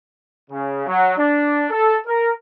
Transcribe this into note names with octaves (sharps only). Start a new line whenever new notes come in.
C#3
F#3
D4
A4
A#4